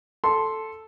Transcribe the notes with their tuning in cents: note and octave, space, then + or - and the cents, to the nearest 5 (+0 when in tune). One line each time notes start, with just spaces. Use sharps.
A4 +0 C6 +0